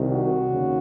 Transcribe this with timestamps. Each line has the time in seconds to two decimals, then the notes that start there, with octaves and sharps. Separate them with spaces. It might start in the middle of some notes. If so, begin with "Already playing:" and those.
Already playing: C2 C3 D#3
0.10 F#4
0.48 D#2 C#3